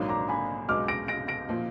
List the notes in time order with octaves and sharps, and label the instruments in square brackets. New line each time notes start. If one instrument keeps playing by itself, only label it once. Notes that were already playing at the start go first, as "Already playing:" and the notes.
Already playing: [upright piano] A#1 G#2 D#3 F#3 A#3
[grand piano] A#5 D6
G#5 B5
[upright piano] B1 B2 G#3 [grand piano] D6 F6
[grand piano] A#6 D7
A#6 D7
A#6 D7
[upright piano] A#2 F3